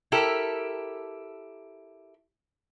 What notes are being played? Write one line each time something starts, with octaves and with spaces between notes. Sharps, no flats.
E4 G4 A4 A#4